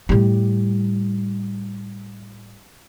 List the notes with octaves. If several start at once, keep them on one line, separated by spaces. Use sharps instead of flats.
A2 G3